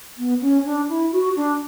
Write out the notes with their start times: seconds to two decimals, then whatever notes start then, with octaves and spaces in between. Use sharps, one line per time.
0.18 B3
0.41 C#4
0.65 D4
0.89 E4
1.12 F#4
1.36 D4